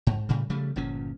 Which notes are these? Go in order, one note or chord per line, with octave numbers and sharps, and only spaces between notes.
G#2
A2 C#3 G3
C#3 F3 G3 A3
G1 A#2 F3 C#4